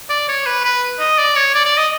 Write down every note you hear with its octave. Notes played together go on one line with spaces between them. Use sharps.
D5
C#5
B4
B4
D#5
D5
C#5
D5
D5
D#5